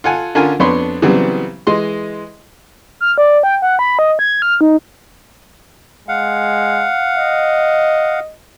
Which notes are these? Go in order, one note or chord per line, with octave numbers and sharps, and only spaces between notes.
F4 A4 F#5 G#5
D3 C#4 D4 F4 A#4 G#5
F2 B3 D4 C#5 B5 C6
C#3 E3 F#3 G3 B3 C4
E3 G#3 D#5 C6
F6
D5
G5
F#5
B5
D#5
G#6
F6
D#4
G#3 F5 F#5
D#5